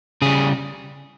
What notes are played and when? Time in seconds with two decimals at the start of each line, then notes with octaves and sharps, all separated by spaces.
0.22 C#3 G3 G#4